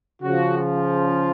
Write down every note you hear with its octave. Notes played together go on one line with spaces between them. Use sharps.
C#3 F3 F#4
F4